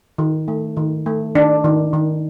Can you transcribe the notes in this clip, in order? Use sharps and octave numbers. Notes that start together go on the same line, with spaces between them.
D#3
A3
D#3
A3
D#3 D4
D#3
D#3